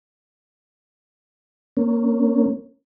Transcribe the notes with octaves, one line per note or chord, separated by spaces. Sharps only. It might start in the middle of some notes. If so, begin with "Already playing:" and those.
A#3 C#4